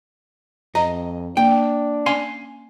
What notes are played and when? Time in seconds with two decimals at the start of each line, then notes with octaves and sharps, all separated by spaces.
0.75 F2 D#5 A#5
1.37 A#3 D4 G5
2.06 C#4 F5 G#5 C6